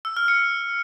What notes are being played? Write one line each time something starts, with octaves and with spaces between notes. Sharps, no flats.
E6
F6
C#7